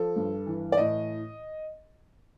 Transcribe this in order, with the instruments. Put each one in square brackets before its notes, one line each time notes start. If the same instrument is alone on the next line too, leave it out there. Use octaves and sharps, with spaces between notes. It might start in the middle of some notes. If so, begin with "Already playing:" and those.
Already playing: [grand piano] F3 A4
G2
E3
D5
A2 D#5